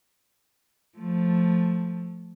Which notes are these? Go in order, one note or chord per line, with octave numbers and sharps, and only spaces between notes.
F3 A3